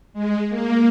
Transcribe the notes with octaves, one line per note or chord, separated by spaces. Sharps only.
G#3
A#3